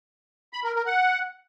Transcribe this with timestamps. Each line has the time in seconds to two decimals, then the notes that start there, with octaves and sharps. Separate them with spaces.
0.53 B5
0.64 A#4
0.75 A#4
0.86 F#5